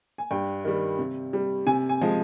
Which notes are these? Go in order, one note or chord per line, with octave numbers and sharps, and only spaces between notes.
G#5
G2 G5
D#3 G3
C3
G3
C3 G#5
G#5
F3 G#3